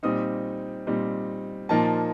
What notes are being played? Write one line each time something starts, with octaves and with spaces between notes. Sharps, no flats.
A#2 G3 C4 D#4 D#6
A#2 G3 C4 D#4
A#2 F3 A#3 D#4 A5